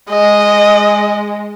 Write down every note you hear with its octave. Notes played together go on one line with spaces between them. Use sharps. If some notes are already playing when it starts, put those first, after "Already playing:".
G#3 D#5